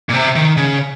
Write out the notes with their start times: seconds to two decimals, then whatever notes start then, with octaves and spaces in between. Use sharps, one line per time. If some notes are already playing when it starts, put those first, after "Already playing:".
0.09 A#2
0.14 C3
0.36 D#3
0.57 C#3